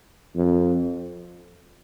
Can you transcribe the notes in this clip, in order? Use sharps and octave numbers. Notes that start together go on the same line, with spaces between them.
F2